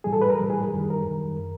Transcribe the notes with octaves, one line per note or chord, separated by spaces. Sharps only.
A2 E3 G3 G#4
A4
B4
A#4
A2 E3 G3
G#4
A#4
F#2 D#3 G3
A#4
F#2 D#3 G3